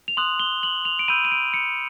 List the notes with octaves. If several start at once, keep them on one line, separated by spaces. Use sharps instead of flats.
F7
C6 D#6 F#6 F#7
G7
F#7
F7
D7
B5 E6 G6 D#7
D#7
D7
C#7